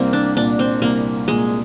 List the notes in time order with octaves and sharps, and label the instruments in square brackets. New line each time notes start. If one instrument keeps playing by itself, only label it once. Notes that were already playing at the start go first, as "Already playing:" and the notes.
Already playing: [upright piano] C2 [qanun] A#3 C4
[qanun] D4
[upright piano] A#2 [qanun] D4
[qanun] C4
[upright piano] C2 [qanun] A#3
[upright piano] A#2 [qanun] G#3